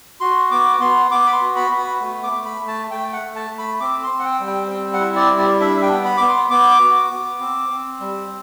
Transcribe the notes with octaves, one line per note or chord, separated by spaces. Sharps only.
F#4 C6
B3 D6
B3 C6
B3 D6
B5
C6
F#4
B5
B3
B5
A3
D6
A3
B5
A3
A5
A3 G5
F#5
A3
A5
A3
B5
C4 D6
C6
C4
F#5
G5
G3
G5
C4 G5
F#5
E4
D5
G3
D5
D4 E5
G5
B3
B5
B3 D6
C6
B3 D6
F#4
B3
C4
C4
G3